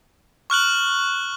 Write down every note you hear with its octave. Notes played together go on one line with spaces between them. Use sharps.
C#6 F6 F#6 F#7